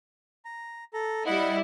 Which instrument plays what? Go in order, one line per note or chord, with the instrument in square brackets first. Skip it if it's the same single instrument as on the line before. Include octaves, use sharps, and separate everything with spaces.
[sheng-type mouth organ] A#5
A4 A#5
[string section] G3 E4 [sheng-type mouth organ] D#5 F#5